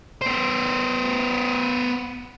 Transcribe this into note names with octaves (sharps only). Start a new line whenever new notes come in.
B3 C5